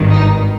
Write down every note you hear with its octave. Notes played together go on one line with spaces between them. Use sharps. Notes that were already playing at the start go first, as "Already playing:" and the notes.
Already playing: G#1 G2 D#3
D#4